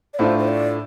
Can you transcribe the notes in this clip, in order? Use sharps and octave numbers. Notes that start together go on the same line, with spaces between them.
D5
A2 A3 D4 F4 C5
C5
D5